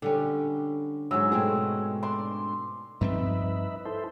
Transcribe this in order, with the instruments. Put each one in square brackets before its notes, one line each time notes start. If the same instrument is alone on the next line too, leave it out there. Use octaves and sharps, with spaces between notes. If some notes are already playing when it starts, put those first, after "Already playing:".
[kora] D3 G3 C#4
[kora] G#2 F#3 [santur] C#5 G#5 E6
[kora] B2 C4 G#4 [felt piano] G#3 A3
[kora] D4 [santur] C6
[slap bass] G2 F3 C4 [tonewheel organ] D#4 B4 E5
[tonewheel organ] E4 A4 C5